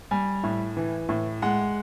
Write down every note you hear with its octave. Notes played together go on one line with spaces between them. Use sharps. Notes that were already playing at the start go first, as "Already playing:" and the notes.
G3 G#5
A2
E3
A2
G#3 F#5